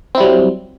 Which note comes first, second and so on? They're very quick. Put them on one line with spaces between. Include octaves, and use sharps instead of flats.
C4 E4 G3 F#3